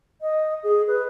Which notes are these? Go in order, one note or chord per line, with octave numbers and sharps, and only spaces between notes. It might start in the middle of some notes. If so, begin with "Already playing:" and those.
D#5
G#4
B4